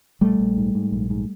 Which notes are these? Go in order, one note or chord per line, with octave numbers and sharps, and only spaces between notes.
A#1 G3 A3
A#1
G#2
G#2
A#1
G#2